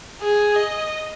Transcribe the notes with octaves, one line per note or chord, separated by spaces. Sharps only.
G#4
D#5